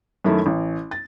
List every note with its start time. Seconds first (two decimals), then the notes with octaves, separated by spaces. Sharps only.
0.24 F#2 D#3 A3 E4
0.46 A1
0.91 A6